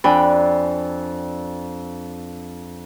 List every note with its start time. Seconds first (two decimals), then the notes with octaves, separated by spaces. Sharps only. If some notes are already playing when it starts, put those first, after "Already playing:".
0.04 F2 D4 G5 G#5 B5